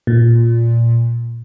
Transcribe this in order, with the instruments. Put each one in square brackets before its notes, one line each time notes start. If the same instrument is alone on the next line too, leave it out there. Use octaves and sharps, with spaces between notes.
[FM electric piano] A#2